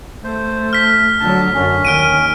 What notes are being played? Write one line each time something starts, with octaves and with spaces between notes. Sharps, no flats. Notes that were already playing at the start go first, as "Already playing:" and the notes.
A3 C5
F6 B6
D3 F#3 A5
F#2 D3 C#4
D#2 D#3 F6 D7 D#7